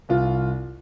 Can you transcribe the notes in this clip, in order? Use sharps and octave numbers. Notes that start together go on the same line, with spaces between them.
C2 F4